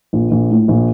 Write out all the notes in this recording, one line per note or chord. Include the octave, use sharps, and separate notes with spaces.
A#1
A#1
A2
A#1